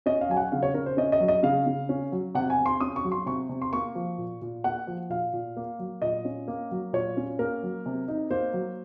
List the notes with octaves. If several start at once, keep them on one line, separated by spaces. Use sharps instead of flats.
C#4 D#5
F5
F#3 G#5
F#5
C#3 F5
C#5
C#3 A#4
C5
C#4 D#5
D#5
F#3
D#5
C#3 F5
C#3
C#4
F#3
C3 F#5
G#5
C3
C6
C#4 D#6
C#6
F#3
C6
C3 C#6
C3
C6
A#3 C#6
F3
A#2
A#2
A#3 F#5
F3
A#2 F5
A#2
A#3
F#3
A#2 D#5
C#4
A#3
F#3
A#2 C#5
C#4
A#3 A#4
F#3
C3
D#4
A#3 C5
F#3